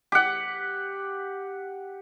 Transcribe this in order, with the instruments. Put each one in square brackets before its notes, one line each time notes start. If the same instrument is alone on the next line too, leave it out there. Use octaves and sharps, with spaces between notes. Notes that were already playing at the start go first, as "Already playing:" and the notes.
[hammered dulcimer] G4 F#5